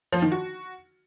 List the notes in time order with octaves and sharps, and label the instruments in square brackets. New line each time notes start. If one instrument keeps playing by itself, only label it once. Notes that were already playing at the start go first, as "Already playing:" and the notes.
[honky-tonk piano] F3
D#3
F#4